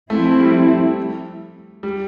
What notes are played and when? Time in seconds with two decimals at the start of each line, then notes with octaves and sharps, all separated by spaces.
0.10 F3 A3 C4 E4
0.26 A3
0.40 G3
1.83 G3